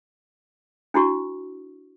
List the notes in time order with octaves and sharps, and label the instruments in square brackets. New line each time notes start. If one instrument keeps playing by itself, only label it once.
[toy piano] D4 E4 F#4 C#6